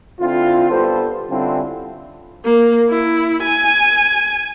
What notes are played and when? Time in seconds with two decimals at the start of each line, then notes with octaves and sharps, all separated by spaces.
0.20 D3 C4 E4 F4
0.70 G2 G3 B3 A4 C5
1.30 D3 G3 C4 C#4 E4 F4
2.45 A#3
2.89 E4
3.42 G#5